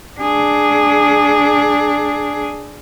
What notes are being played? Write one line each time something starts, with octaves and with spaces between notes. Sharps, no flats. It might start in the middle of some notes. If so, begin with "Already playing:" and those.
D4 G#4